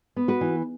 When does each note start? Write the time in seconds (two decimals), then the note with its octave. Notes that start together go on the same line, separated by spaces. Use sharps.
0.16 B3
0.28 F#4 B4
0.41 E3